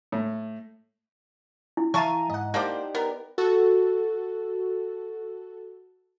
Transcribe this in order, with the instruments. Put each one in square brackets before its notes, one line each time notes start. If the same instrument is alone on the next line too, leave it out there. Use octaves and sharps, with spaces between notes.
[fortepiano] A2
[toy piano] E4
[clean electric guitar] E3 A#5 [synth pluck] E5 A5 D#7 [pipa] F5 C#6
[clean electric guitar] G#2 [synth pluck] D#5 F#5
[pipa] A#3 D4 C5 [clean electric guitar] D#4 G4 D5
[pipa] B3 [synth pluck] A#4
[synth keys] F#4 A4